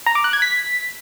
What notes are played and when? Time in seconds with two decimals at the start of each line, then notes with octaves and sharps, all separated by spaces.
0.06 A#5
0.15 D6
0.24 F#6
0.33 G#6
0.42 B6